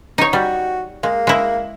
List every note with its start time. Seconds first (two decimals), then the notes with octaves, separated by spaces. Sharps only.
0.18 D#4 C#5
0.33 G3 F#4
1.03 G#3 A#3
1.27 G#3 E4